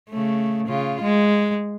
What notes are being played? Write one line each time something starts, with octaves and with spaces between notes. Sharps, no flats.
C#3 A3
C#3 F4
G#3